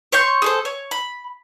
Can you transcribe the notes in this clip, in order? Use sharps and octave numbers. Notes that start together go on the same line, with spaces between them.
C#5 C6 C#6 G6
G#4 A4 C5
C#5
B5